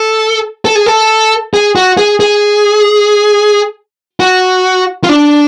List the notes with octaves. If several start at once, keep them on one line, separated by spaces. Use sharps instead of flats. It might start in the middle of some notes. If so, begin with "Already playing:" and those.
Already playing: A4
A4
G#4
A4
G#4
F#4
G#4
G#4
F#4
F4
D4